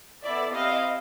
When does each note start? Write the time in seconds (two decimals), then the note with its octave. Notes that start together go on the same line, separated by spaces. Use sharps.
0.23 B3 E4 A4 D5 E5
0.52 C4 E4 G4 D#5 F5